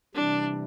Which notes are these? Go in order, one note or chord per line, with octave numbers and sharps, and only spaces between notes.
C3 E3 G3 D4